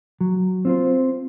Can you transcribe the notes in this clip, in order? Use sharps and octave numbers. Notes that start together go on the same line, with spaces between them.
F#3
C4 F4 C5